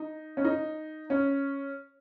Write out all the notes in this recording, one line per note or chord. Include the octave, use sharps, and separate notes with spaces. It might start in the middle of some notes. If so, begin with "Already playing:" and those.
Already playing: D#4
C#4
D#4
C#4